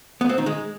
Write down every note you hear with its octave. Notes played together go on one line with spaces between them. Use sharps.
B3
C4
D#3
G#3